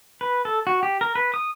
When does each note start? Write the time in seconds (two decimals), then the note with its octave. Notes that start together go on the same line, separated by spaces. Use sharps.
0.21 B4
0.45 A4
0.67 F#4
0.83 G4
1.01 A#4
1.15 B4
1.34 D#6